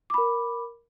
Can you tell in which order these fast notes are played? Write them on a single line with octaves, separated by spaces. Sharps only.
D6 B5 A#4